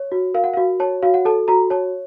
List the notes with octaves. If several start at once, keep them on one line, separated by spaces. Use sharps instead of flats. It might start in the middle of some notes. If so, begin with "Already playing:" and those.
Already playing: C#5
F#4
A#4 F5
F#5
F5
F#4
C#5 A5
F#4 F5
F#5
A4 A5
F#4 A#5
C#5 A5